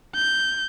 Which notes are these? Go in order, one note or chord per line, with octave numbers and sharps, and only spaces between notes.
G6